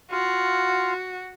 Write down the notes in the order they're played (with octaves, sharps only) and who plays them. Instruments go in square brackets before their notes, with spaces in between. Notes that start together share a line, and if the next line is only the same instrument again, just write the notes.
[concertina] F4 F5 [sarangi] F#4